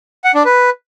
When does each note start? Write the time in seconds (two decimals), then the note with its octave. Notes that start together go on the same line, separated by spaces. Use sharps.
0.24 F#5
0.35 D4
0.45 B4